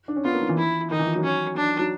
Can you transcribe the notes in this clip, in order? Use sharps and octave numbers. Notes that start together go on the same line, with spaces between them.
D4
C#4
B3 F4
A#3
F3
E3
E4
D#3 D#4
E3
F3
F#3
C#4
D4
F#3